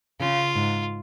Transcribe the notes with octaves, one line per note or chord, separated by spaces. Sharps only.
C#3 F4
G#2